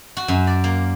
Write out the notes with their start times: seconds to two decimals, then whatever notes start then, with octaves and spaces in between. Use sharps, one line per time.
0.17 F#4
0.28 F#2
0.47 D5
0.64 A#3